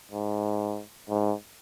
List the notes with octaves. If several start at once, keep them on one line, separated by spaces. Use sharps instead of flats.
G#2
G#2